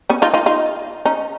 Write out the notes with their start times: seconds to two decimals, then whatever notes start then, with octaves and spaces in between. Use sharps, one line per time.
0.09 B3 C#4
0.22 D#4 F4
0.33 D#4 F4
0.46 D#4 F4
1.05 C#4 D#4